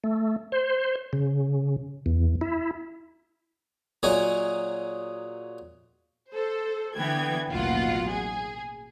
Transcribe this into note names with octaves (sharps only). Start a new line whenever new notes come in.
A3
C5
C#3
E2
E4
A#2 F#3 G#4 D#5
A4 C5
D3 E3 B3 G5 G#6
A1 D#2 B2 F#3 F4 F#5
G#4